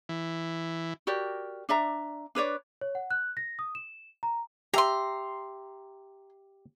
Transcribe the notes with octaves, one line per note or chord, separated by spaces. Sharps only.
E3
F#4 G4 A#4 D5
D4 D5 E5 A#5
D4 B4 C#5 D5
C#5
F#5
F#6
A#6
D#6
E7
A#5
G4 E5 A#5 C6